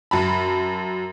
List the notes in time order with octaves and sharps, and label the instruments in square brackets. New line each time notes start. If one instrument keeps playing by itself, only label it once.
[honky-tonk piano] F#2 A5 B5